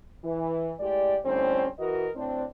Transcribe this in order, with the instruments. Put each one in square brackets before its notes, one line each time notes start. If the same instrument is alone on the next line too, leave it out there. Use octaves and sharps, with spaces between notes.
[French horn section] E3
A2 G#3 G4 D5
A2 D3 G3 C4 C#4 C5
E3 F#4 A#4 D#5
A2 C4 D4